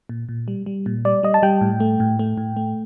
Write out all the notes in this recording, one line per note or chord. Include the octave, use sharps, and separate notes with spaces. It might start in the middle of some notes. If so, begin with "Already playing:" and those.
A#2
A#2
G3
G3
A#2
G3 D5
G3 D#5
A5
G3 G5
A2
A3
A2
A3
A2
A3